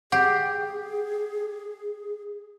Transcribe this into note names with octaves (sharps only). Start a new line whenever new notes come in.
G4 G#4 F#5